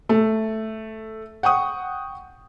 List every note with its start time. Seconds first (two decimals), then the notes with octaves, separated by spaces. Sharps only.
0.09 A3
1.43 F#5 G5 C#6 D#6